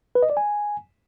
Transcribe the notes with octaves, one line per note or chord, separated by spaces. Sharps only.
B4
D#5
D5
G#5